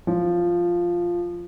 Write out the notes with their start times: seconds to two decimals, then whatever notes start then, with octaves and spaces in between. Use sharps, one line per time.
0.07 F3